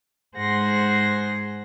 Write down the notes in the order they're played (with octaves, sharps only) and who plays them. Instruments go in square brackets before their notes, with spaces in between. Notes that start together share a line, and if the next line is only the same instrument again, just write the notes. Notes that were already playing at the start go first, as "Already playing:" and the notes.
[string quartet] G#2 G#4 C5 F#5 C6 A#6